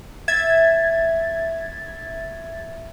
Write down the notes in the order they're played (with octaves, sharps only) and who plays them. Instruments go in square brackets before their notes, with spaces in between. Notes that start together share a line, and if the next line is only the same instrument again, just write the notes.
[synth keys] E5 G#6 A6